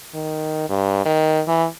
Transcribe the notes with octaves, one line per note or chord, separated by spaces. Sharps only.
D#3
G2
D#3
E3